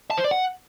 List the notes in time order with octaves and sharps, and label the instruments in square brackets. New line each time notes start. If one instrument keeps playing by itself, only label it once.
[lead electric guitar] A5
C5
D5
F#5